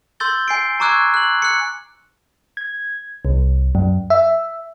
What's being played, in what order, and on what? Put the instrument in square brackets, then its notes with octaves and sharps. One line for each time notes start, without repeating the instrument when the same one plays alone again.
[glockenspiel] C6 E6 G6 A6 G7
G#5 C7 D7
A#5 C#6 D6 E6 F#6 G#6
F#6 F#7
F#6 C#7
[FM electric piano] G#6
C2
F#2
E5